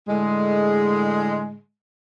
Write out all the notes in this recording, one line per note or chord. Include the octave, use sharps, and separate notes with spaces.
A2 D3 G#3